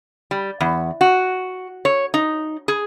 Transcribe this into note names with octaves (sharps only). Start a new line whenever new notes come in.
G3
E2
F#4
C#5
D#4
G#4